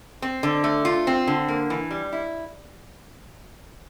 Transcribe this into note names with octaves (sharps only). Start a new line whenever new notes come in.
C4
D3
A3
F4
C4
D3
A#3
E3
G3
E4